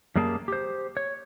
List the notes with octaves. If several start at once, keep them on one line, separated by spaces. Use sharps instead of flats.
F#2 G3 A#3 G#4 G#5 A5
G4 C5
C#5